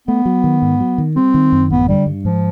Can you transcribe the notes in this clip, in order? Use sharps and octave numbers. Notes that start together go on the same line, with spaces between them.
A3 B3
F#3
D#3
G#2
F#3
D#3
G3 C4
D#3
F#2
A1 B3
D3 G3
G2
G#2 F3